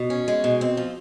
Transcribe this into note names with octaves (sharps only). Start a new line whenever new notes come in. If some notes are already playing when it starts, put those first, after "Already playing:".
Already playing: B2
C#4
G#3
B2
C4
F3